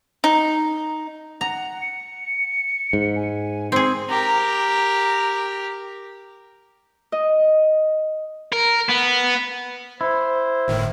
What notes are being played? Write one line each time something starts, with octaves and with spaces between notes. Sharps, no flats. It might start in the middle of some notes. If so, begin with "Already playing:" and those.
D#4
F#5 A#5
C#7
G#2
G#5
C4 G#4 C7
G4 A#4
D#5
A#4
B3
E4 C5
G1 A2 D#3